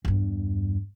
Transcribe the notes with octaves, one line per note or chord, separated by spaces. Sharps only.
E2 G2